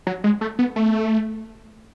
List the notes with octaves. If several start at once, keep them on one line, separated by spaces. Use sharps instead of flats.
F#3
G#3
A3
B3
A3